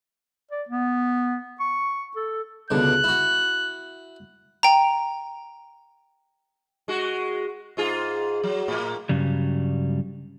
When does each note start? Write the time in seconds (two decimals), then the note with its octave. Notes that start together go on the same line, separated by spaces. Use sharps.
0.51 D5
0.69 B3
1.60 C#6
2.16 A4
2.71 C#2 B2 D3 F#6
3.04 E4 F#4
4.63 G5 A#5
6.88 G#3 F#4
7.77 G#2 F4 G#4
8.43 F#3
8.68 A2 A#3
9.09 G2 C#3 F#3 G3